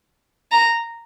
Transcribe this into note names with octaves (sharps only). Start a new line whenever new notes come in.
A#5